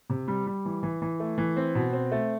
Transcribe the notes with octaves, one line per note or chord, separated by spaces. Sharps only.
C3
G3
G3
E3
E3
E3
A3
E3
C4
B2
C4
A3